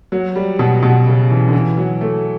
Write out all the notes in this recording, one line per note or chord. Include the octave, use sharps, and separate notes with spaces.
F#3
G3
B2
B2
C#3
E3
D3
E3
F#3
A3